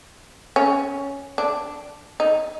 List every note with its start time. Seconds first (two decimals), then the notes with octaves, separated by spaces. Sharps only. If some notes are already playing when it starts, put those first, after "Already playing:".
0.56 C#4
1.38 D4
2.20 D#4